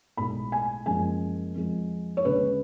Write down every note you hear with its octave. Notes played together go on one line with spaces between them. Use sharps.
B1 A2 G#3 B5
G#5
F#1 F#2 F3 G#3 G#5
F2 F3 G#3
C#5
D2 C#3 G#3 B4